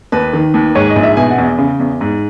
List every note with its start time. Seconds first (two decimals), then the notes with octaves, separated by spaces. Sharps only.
0.12 D#2 B4
0.33 D#3
0.54 D#2
0.75 G#2 C#5
0.89 D#5
0.96 A#1
1.03 E5
1.17 B2 G#5
1.31 F#5
1.38 E2
1.58 C#3
1.80 E2
2.01 G#2